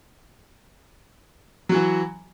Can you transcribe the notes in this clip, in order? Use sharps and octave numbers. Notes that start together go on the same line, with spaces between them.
E3 F#3 F#4